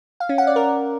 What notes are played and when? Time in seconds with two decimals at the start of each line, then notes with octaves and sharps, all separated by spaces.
0.20 F5
0.29 C#4
0.38 F#5
0.47 D5
0.56 A#4